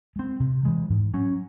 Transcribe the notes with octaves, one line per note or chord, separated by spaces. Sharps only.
G#3 C4
C3
E3 G#3
G#2
F#3 C#4